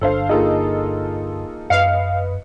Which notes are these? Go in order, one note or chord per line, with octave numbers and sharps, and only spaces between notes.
G1 D4 A4 C5 F5
A#3 D#4 F4 G#4 A4 D#5
F#2 B4 D#5 F5 C#7